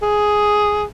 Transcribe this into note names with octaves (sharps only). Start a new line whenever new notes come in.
G#4